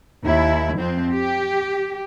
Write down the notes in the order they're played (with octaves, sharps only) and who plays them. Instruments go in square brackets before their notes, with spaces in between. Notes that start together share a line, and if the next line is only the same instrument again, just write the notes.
[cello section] D#2 E4
F2 C4
G4